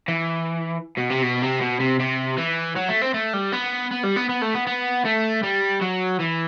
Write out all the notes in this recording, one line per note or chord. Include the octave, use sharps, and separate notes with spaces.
E3
B2
C3
B2
C3
B2
C3
C3
E3
F#3
A3
C4
A3
G3
B3
B3
G3
B3
B3
A3
B3
B3
A3
G3
F#3
E3